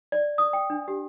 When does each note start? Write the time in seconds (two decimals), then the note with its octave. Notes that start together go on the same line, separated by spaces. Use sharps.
0.12 D5
0.38 D#6
0.53 G5
0.70 D4
0.88 G4